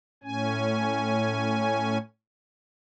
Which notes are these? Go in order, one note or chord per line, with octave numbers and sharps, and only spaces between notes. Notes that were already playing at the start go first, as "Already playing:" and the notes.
A2 C#4 G#5